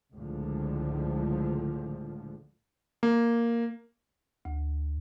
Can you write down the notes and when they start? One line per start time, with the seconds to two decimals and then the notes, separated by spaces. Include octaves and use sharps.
0.14 C#2 A2 D3 F3
3.03 A#3
4.45 D2